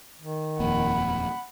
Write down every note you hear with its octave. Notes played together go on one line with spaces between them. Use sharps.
D#3
D#1 F2 A#3 F#5 B5